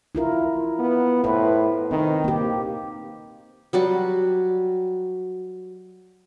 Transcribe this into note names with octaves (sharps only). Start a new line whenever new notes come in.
E4 F4 A#4
B3
A2 B4 C5
D#3 C4
A#3 G4
F#3 G3 F#4